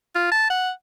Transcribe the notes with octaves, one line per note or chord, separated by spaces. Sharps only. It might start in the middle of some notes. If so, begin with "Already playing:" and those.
F4
A5
F#5